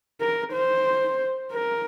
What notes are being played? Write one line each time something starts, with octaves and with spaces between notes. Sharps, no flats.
A#4
C5
A#4